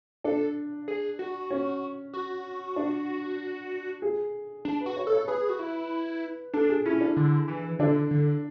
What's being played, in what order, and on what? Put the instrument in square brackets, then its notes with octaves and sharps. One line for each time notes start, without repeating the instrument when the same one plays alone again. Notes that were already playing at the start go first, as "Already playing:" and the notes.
[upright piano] D4 [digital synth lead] A4
[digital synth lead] G#4
F#4
[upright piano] C#4
[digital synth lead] F#4
[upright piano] D4
G#4
[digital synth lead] D4
[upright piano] B4
[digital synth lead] F#4
[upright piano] C#5
[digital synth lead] A4
[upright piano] C#5
[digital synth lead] G#4 [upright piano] B4
[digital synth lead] F#4
E4
[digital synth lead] D4 [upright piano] A4
[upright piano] G#4
[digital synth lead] C#4 [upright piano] E4
[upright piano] D4
[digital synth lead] D3
E3
[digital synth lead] D3 [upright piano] D4
[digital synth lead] D3